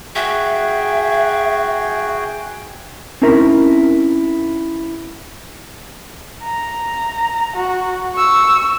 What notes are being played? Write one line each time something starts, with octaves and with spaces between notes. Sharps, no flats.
F#4 G#4 E5 G5
C4 C#4 D#4 E4 A#4
A#5
F#4
C#6 E6